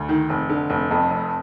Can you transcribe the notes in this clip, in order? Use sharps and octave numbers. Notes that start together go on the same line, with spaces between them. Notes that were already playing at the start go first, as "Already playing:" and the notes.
Already playing: D2
D#3
F1
D3
F1
F2
F1